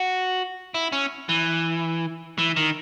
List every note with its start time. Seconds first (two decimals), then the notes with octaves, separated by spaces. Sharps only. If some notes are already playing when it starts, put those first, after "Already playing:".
Already playing: F#4
0.74 E4
0.92 C#4
1.29 E3
2.38 E3
2.56 D#3